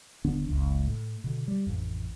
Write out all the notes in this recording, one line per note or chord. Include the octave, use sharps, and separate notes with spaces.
D#1 D3 B3 D4
F#1 C#2
A2
B2 D3
G3
A1 F2